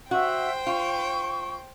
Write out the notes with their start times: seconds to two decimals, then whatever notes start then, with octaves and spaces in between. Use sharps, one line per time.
0.11 F#4 C5 E5 G5
0.67 F4 C#6